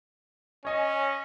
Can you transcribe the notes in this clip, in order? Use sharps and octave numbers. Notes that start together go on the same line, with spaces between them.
C#4 C#5 D#5 G#5